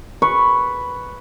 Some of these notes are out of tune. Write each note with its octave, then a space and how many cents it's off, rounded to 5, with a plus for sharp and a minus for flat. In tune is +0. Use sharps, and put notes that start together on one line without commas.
B4 +0 C#6 +0